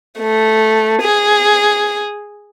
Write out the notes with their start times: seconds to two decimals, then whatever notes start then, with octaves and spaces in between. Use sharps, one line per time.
0.19 A3
1.01 G#4